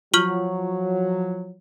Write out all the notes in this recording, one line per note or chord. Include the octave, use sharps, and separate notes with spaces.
F3 F#3 F4 C#6 F6 F#7 G7